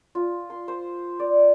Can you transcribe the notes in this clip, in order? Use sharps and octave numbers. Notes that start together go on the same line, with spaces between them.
F4
C6
C5
D5